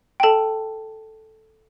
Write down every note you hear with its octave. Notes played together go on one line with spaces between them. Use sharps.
G5
A4 A5